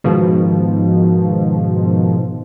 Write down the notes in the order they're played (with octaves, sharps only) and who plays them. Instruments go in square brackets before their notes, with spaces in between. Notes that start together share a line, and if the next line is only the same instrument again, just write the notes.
[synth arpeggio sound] G#2 B2 D#3 F3